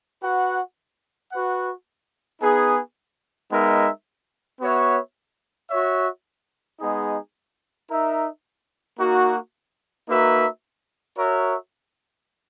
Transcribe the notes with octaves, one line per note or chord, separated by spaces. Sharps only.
F#4 B4 F#5
F#4 B4 F#5
B3 D#4 G#4
G#3 B3 D#4 A#4 E5
B3 F#4 C#5 E5
F#4 C#5 E5
G#3 B3 D#4 G#4 D#5
D#4 A#4 E5
A#3 D#4 F#4
A#3 D#4 F#4 B4 E5
F#4 A#4 C#5 E5